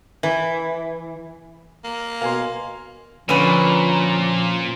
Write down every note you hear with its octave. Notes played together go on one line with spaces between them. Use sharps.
E3
A#3
B2 A#4 F5 G#5 C6
A#2 D3 F3 C#4 B4 D#7